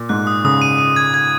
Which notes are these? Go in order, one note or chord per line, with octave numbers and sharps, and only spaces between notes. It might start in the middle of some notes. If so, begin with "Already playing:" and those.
Already playing: A#2
G#2 F#6
D#6
C#3 D#6
D#7
D#7
G#6
G#6